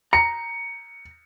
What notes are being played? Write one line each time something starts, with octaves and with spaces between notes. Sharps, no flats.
A#5 C#7